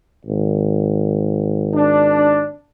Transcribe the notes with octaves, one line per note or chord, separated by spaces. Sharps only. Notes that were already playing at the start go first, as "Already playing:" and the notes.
G#1
D4